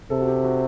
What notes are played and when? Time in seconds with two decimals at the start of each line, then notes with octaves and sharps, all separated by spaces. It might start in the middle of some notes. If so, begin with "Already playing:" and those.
0.10 C3 A4
0.21 F#4
0.28 G4
0.44 F#4